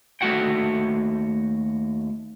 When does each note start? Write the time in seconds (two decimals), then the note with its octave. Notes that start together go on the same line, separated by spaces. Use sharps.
0.21 D#2 A3 D4 F#4 F#5 G5